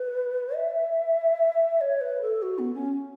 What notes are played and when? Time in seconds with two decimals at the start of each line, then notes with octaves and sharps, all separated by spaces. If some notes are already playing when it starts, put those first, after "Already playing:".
Already playing: B4
0.56 E5
1.81 C#5
2.01 B4
2.22 A4
2.42 F#4
2.59 B3
2.74 C#4